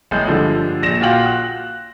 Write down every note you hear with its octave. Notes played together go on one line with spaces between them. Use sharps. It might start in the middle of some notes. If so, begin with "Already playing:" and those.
F#1 G#3 G6
G2 D3 F3
A#1 A#6 E7
A#2 F4 F#4 F5 G5 F#7
F#6